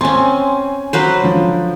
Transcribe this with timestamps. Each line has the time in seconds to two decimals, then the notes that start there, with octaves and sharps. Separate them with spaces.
0.01 C4 C#4 G#5 C6
0.93 F#3 B4 C5
1.22 D3 F3